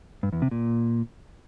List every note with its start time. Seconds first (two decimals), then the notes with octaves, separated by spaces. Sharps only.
0.23 G2
0.33 E2
0.42 C3
0.51 A#2